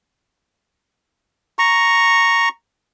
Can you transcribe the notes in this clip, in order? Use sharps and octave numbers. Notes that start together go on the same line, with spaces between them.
A#5 C#6